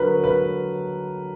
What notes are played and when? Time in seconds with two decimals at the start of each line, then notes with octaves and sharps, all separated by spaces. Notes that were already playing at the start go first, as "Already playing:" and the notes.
Already playing: D3 F#3 A#4 B4
0.24 B4